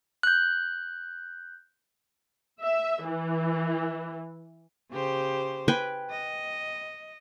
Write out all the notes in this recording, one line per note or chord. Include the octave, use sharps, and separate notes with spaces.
F#6 G6
E5
E3
C#3 G4 C5
B4 G5 G#5
D#5